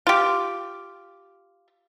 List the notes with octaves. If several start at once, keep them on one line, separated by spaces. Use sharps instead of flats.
F4 G4